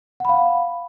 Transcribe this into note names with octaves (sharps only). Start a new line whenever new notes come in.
F5 F#5 B5